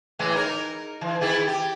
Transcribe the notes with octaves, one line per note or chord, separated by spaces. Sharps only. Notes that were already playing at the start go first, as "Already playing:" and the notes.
A2 E3 G#3
D#4 A#4
E3
D#3 E4 G#4
G4